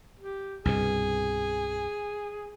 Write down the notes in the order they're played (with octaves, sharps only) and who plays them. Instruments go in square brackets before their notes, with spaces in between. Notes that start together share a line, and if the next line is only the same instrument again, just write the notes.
[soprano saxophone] G4
[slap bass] C2 G2 B2 [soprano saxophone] G#4